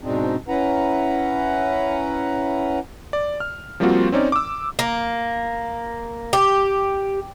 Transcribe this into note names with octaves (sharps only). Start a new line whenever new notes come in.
G#2 B2 G#3 C4 D4 D#4
C#4 E4 B4 F#5 A#5
D5
F6
F3 G3 A#3 C4 F4 F#4
C4 C#4 D#4 D5
D6 E6
A#3
G4